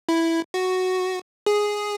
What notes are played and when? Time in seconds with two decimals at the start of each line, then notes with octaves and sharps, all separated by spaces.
0.09 E4
0.54 F#4
1.46 G#4